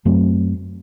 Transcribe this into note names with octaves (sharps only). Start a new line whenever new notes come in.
F#2 F#3 A3 C4